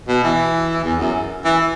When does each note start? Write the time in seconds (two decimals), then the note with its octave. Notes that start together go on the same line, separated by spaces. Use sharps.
0.08 B2
0.24 E3
0.84 E2
1.00 F#2
1.45 E3